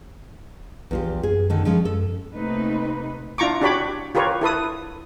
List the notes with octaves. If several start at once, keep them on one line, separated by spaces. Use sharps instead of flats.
A#1 E2 F4 G4
F#2 G#4
D3 D#3 A3
F3 G#3 C#4
F#2 A4
C3 A3 A#3 C4 D#4 B4
D4 E4 F4 A#5 C#6 D6
D4 F#4 G4 C#5 B5 D6
F4 G4 A#4 B4 C#5
E4 A4 B4 D#6